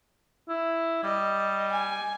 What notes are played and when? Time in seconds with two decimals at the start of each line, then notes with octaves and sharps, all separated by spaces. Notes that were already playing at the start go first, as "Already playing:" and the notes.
0.49 E4
1.04 G3 D#5
1.72 G#5